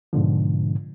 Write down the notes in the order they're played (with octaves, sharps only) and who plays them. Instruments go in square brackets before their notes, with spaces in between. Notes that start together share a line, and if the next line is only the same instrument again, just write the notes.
[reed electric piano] G#2 B2 D3 F3